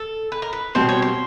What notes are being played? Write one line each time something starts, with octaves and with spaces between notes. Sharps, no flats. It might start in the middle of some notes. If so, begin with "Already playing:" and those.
Already playing: A4
B4
A#4
B4
B2 G3 C4 C5
C#5
C5